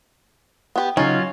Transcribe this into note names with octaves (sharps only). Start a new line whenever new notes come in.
B3 G4
C#3 F#3 C#4 D#4 F4